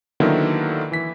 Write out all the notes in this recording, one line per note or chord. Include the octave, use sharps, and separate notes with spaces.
D3 D#3 F#3 A#3 B3 E4
E3 B6